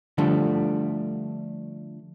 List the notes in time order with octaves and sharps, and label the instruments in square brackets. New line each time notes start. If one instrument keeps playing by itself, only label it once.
[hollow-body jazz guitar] D3 F3 G3 A3 D4